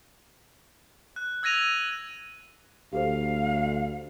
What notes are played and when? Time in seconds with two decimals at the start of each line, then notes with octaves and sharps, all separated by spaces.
1.16 F#6
1.43 E6 G#6 A#6 D#7 F7
2.93 D2 G4 A4 C5 F5